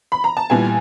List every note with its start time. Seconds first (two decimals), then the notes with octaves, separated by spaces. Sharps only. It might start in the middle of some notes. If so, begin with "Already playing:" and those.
0.12 B5
0.24 A#5
0.37 A5
0.50 A#2 G3 B3 E4 G#5